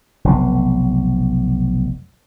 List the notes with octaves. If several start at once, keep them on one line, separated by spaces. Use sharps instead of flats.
F1 B1